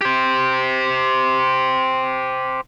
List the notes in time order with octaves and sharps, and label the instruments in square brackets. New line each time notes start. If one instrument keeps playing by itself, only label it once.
[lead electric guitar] G4 C5